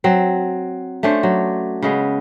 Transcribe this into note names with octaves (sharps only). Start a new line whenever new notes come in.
F#3 C4
A3 C#4 D4 C5
F#3
C#3 G#3 B3